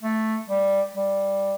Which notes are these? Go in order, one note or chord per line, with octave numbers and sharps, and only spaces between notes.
A3
G3
G3